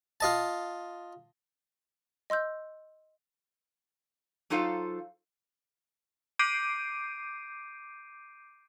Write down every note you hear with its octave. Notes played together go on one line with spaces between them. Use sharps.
F4 D#5 A5
D#5 C6 E6 G6
F#3 D#4 F4 A4 C5 F5
D6 G6 C7 D7 D#7